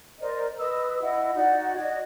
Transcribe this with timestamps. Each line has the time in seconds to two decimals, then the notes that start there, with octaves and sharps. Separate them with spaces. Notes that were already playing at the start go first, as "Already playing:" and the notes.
0.20 A#4 C5 D5 D#5
0.59 B4 D#5 D#6 E6
1.01 E4 D#5 F#5
1.35 D#4 F#4 D5 F#5
1.76 F#4 D5 D#5 G#6